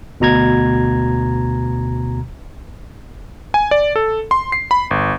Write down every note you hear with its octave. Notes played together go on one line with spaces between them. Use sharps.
D2 B2 A#5 G#6
G#5
D5
A4
C6
C7
B5
G1